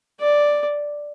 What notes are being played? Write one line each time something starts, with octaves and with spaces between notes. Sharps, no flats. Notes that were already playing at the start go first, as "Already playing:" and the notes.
D5